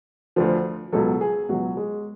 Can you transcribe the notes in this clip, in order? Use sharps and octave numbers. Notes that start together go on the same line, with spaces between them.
D2 D3 F3
C#2 B2 F#3 A4
G#4
C#2 B2 F#3 F#4
G#3